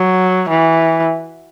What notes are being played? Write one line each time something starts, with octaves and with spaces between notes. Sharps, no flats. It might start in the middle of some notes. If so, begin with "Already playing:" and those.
Already playing: F#3
E3